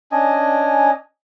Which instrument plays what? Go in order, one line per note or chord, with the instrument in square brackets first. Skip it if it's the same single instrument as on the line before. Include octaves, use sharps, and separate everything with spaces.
[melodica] C#4 D4 D#5 G#5